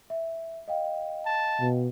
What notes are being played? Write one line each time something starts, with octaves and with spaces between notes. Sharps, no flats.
E5
D#5 F5 G5
A5
B2